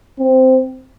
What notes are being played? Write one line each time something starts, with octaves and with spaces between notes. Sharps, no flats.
C4